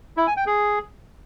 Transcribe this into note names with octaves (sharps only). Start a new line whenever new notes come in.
E4
G#5
G5
G#4